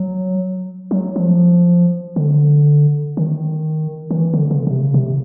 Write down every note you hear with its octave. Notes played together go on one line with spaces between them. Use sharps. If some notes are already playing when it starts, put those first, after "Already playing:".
Already playing: F#3
F#3
F3
D3
D#3
D#3
E3
D3
C#3
C3
C#3
C3